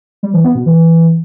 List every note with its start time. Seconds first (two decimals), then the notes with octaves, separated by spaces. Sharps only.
0.23 G3
0.34 E3
0.44 B3
0.55 B2
0.66 E3